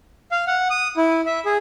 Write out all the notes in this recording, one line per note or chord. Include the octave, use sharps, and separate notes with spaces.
F5
F#5
D#6
E4
E5
G#4